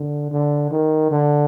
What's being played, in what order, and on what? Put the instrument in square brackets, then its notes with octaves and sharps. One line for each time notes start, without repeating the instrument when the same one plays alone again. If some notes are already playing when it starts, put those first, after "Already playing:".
Already playing: [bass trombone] D3
D3
D#3
D3